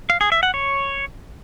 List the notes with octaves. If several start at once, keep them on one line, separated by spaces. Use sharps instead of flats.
F5
G#4
E5
F#5
C#5